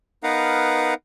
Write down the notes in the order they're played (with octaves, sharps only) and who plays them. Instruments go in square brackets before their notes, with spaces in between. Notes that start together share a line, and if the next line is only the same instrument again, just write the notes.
[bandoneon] B3 D#4 A#4 B4 F5 F#5